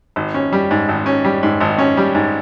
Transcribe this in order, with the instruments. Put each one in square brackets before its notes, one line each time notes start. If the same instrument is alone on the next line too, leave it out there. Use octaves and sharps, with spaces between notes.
[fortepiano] G#1
C#4
G3
G#2
G#1
C#4
G3
G#2
G#1
C#4
G3
G#2